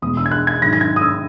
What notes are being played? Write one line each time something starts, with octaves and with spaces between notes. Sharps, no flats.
E2 B2 G#3 B3 D#6
E6
G#6
F#6
G#6
G#2 D#3 F#3 A#6
A#6
G#6
D#6
E6